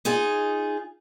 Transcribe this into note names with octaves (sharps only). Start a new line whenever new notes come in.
D#4 F4 G#4